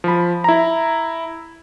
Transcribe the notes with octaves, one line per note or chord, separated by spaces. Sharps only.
F3 B5
E4 A#5